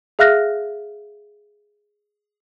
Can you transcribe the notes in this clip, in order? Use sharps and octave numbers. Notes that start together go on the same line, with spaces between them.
G#4 E5 F5 F6 F#6 A#6